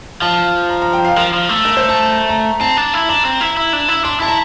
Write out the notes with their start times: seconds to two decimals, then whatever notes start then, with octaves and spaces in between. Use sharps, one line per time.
0.22 F3 A5
0.69 A#5
0.82 A#5
0.93 G5
1.05 F5
1.17 F3 A#4
1.33 F3
1.49 A3
1.65 A#4
1.77 C5
1.89 A5
2.13 A#5
2.29 A#5
2.61 C4 A5
2.77 D4
2.93 E4
3.09 D4 A#5
3.25 C4
3.41 E4
3.57 E4
3.73 D4
3.89 E4
4.05 D4 C6
4.20 E4 A5
4.28 A#5